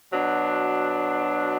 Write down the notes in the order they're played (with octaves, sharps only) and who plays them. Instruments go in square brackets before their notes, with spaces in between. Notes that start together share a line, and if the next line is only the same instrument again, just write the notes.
[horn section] B2 F#3 D4